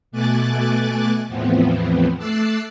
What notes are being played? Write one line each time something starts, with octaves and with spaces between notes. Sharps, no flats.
B2 A3 G#5 D6 F#6 A6
E2 A2 E3 F3 B3 C4
A3 D6 E6 F#6 A6 C7